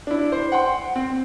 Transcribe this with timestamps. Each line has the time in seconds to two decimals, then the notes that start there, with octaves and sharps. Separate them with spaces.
0.07 D4 E4
0.32 C5
0.52 F#5 G5 C6
0.96 C4